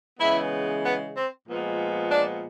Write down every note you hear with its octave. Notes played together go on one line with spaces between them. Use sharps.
C#3 E3 G#3 B3 E4
B3
C4
A#2 F3 G#3 B3
D4